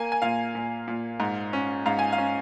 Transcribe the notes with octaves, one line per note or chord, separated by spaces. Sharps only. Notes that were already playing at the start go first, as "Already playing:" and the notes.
Already playing: A#3 G#5
G#5
A#2 F5
A#2
A#2
G#2
C#4
G#2 F5
G#5
F5
C#4